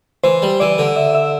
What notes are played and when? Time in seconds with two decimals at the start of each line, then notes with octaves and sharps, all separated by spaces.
0.24 E3 C5
0.42 G3
0.60 E3 D5
0.78 D3
0.96 E5
1.15 E5